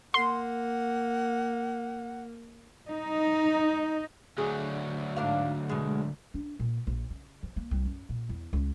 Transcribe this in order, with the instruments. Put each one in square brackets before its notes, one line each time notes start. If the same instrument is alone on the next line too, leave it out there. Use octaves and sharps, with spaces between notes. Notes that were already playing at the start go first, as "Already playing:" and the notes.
[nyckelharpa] A#3 [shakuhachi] F#5 [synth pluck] C6
[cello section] D#4
[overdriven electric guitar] D2 F#3 [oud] G#4
[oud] G#2 D4 F5
B2 G#3
[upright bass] D4
A#2
A#1
C#3
F3
A#3
C2
F#2
A#2
E2
C#2